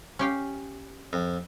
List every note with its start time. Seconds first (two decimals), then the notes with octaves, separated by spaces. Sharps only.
0.19 C#4 G4 F5
1.13 F2